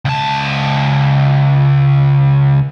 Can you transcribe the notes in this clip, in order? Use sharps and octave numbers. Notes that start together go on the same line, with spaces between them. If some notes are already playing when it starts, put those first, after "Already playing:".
C#2 A5